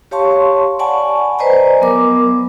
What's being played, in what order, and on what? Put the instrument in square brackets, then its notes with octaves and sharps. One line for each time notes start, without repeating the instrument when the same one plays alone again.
[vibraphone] G4 C#5 F5 A5 C6 C#6
D5 F#5 G#5 A5 B5 C#6
B4 C5 D5 D#5 G#5 A#5
F#3 B3 A#4 D6